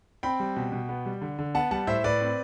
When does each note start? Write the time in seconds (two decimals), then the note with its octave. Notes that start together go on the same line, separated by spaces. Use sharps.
0.23 C4 G5 B5
0.40 G3
0.56 B2
0.72 B2
0.89 B3
1.06 G3
1.22 D3
1.39 D3
1.55 B3 F#5 A5
1.71 G3 F#5 A5
1.87 A2 C5 E5
2.04 A2 B4 D5
2.21 C4